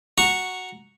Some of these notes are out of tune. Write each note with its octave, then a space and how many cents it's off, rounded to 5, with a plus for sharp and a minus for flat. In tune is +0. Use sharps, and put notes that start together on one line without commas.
F#4 +0 A#5 +0 C#6 -5